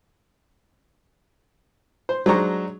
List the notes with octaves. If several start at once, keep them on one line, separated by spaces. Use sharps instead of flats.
C5
F#3 G#3 D4 C5 A#5 C#6